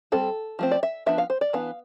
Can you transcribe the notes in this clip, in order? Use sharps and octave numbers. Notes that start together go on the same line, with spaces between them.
G3 C4 A4
F3 A3 C4
D5
E5
F3 B3 D4 E5
F5
C5
D5
E3 B3 D4 F5